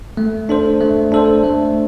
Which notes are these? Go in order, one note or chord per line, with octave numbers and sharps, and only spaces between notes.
A3
D4 A4 C5
A3
D4 A4 C5
A3